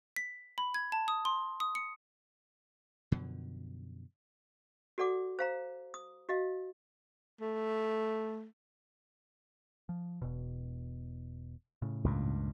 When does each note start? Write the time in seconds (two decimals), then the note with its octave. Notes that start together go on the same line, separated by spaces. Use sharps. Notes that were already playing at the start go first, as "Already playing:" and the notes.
0.16 B6
0.58 B5
0.74 G#6
0.92 A5
1.08 D#6
1.25 C6
1.60 D#6
1.75 C#7
3.12 F#2 B2 D3 F3
4.98 F#4 A4 D5 F#5 D6
5.39 C5 F5 A#5
5.94 D#6
6.29 F#4 D#5 F5
7.41 A3
9.89 F3
10.22 E1 B2
11.82 A2 C#3
12.04 C#2 G2 A#2